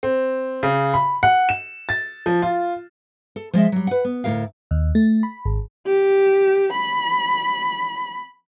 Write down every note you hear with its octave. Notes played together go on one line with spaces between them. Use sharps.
C4
C#3
B5
F#5
E7
A6
F3
F4
A4
F3 G#3 D#5 E5
F#3 G3
B4 F#5
B3
D2 A2 F#3 A#4 F5
D#2
A3
B5
G#1
G4
B5